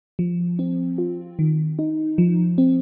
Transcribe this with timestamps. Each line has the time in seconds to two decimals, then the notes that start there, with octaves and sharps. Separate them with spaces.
0.19 F3
0.59 C4
0.98 F4
1.39 D#3
1.79 D#4
2.18 F3
2.58 C4